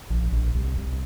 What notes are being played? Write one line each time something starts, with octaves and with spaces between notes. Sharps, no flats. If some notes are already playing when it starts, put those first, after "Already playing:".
A#1
A#1
C2
C2